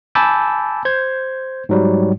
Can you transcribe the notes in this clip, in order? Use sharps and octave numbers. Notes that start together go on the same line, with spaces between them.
G#5 A5 B5 D6 E6 G6
C5 G6 G#6
G#2 F#3 G3